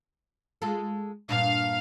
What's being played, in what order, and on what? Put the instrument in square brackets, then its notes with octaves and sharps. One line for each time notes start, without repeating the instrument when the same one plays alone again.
[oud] G#3 F4 A4
[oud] G2 A#2 D4 [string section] F5